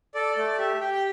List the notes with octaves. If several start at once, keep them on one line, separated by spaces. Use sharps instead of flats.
A4 D5
A3 D5
G4 E5
G4 G5
G5